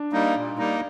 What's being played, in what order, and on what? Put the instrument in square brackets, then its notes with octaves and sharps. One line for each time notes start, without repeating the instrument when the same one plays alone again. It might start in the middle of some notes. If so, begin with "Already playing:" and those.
Already playing: [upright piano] D4
[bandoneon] G3 A#3 D#4
A#2
G3 A#3 D#4